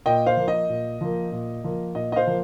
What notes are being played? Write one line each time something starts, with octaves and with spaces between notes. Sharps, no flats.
A#2 D#5 G5
C5 F5
F3 A#3
D#5
A#2
F3 A#3
A#2
F3 A#3
A#2 D#5
D#5
C5 F5
F3 A#3